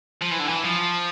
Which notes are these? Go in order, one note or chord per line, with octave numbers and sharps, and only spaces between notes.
F3
E3
D3
E3
F3